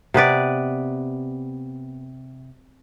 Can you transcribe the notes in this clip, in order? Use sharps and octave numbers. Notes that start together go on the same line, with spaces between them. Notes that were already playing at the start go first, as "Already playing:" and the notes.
C3 B3 B4 D5